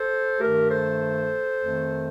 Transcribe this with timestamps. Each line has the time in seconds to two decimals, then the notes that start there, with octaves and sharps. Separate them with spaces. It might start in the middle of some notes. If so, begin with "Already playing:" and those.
Already playing: A4 C5
0.40 G2 D#3 A3 G4 A#4
0.70 A4 C5
1.62 F2 D#3 A3